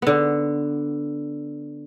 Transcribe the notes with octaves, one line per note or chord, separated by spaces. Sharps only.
D3 B3